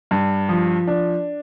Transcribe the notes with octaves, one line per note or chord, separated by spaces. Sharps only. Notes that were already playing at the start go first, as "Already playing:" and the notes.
G2
F3
D4